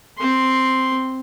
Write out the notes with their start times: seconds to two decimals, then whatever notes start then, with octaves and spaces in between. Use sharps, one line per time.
0.18 C4 C6